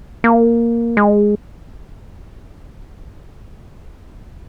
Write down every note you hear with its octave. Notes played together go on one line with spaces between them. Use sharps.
A#3
G#3